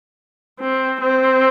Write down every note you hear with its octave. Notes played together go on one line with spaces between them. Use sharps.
C4
C4